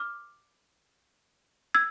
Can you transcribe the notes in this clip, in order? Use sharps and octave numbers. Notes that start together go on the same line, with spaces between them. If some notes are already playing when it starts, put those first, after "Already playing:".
Already playing: D6 F6
E6 G#6